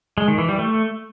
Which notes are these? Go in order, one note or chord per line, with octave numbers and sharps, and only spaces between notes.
G#3
D#3
E3
G3
A3